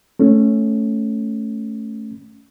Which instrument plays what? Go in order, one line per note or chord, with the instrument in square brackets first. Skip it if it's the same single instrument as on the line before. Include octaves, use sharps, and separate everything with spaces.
[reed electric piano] A3 C#4